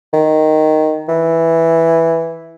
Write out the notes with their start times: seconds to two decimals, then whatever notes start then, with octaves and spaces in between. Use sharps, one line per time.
0.13 D#3
1.08 E3